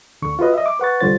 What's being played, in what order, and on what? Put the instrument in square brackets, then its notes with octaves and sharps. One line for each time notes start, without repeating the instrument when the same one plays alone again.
[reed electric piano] D2 D3 C#6
F4 F#4 B4 D#5
D#5 E5
D6
B4 F#5 C#6 A6
C2 D3 G3 F4 C5 A6